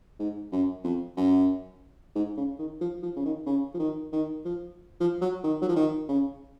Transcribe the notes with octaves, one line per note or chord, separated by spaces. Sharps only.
G#2
F#2
F2
F#2
G#2
C#3
D#3
F3
F3
C#3
D#3
C#3
F3
D#3
D#3
F3
F3
F#3
D#3
F#3
F3
D#3
C#3